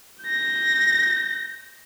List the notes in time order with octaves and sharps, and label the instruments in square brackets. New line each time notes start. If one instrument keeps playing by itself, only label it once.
[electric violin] G6 A#6